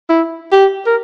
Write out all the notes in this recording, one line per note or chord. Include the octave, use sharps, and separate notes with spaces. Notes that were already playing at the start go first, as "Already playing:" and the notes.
E4
G4
A#4